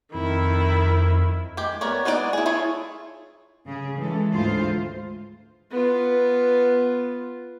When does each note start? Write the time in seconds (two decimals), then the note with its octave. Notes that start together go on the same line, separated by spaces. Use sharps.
0.14 F2 D#3 E4
0.86 F2
1.57 G#3 G4
1.81 B3 A#4 C#5 D5
2.05 G#3 B3 D#4 F#4 D5
2.33 E4 G#4
2.46 E4 F4 G#4 A4 C#5
3.66 C#3 G#4
3.98 E3 G#3 C#4 A4
4.33 D2 G#2 E3 G#3 F4 C5
5.71 B3 F4